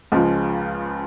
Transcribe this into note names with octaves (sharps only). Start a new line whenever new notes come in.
C#2 C#3 F3 G#3